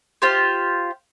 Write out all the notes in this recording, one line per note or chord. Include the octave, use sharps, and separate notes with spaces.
F4 G4 C5